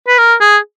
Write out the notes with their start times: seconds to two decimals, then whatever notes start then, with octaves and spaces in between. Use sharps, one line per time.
0.08 B4
0.18 A#4
0.41 G#4